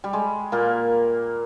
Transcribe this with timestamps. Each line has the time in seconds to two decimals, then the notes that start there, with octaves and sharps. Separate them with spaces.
0.04 G3
0.13 G#3
0.52 A#2 A#3